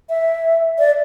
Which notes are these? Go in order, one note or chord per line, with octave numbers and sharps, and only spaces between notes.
E5
D5